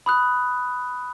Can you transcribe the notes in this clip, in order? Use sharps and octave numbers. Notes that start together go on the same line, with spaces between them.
B5 D#6 F#6